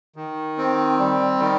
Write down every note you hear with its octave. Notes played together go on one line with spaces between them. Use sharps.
D#3
C4
G3
D#3